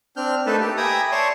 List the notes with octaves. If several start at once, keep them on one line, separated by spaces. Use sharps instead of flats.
C4 D4 F6 G6
A3 A#3 D#4 A4 B4 A5
G4
E5 G5 G#5 A#5 B5 D#6
C#5 D5 A5 C6 C#6